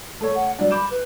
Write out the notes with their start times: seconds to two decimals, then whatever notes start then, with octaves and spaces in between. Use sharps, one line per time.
0.21 A3 A4 C#5
0.35 F#5
0.59 F#3 D4 D5
0.71 B5 D6 G6 E7
0.90 B4